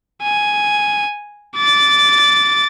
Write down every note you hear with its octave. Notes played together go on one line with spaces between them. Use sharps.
G#5
D6 A6